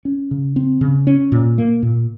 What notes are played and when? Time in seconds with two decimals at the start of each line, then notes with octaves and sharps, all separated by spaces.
0.05 C#4
0.31 C#3
0.56 C4
0.81 C#3
1.07 C#4
1.32 A#2
1.58 A#3
1.83 A#2